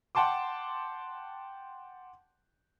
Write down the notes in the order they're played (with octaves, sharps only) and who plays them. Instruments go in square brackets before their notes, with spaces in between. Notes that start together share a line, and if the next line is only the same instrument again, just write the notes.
[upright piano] F#5 G5 A5 C6 D6